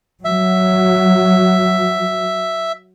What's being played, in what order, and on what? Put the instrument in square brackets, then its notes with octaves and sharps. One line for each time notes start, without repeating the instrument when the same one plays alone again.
[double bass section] F#3 [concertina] E5